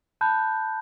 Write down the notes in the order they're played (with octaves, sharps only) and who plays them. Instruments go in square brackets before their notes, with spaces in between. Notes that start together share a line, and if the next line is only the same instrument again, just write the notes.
[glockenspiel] A5 B5 F#6 G6